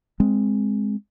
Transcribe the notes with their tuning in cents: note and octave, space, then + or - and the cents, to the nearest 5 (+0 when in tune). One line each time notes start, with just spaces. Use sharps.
G#3 +0 C4 +0